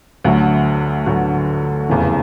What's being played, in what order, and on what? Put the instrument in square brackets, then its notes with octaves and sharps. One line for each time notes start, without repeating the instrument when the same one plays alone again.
[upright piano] D2 D3 F#3
D2 D3 F#3
F1 E2 C#3 E3